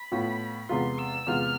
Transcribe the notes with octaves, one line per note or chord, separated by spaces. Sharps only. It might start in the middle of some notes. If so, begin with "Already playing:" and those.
Already playing: B5
A2 F3 B3 F4
E2 C3 G#3 B3 F4 C6
E6
E2 C3 G#3 B3 F4 F6